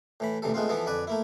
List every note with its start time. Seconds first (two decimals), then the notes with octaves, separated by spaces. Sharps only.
0.20 A2 E3 B5
0.42 A1 D2 C3 E3 A4
0.54 G#3 A3 B3 C4 F4
0.69 E3 F3 B3 E4 A4
0.86 F2 D3 B4 D5 G#5
1.07 A3 A#3 E4